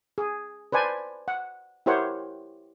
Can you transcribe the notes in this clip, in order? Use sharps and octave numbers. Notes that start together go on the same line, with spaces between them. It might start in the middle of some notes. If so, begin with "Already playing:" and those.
G#4
B4 C5 D5 G#5 A5
F#5
E4 G4 A#4 C5 C#5 F#5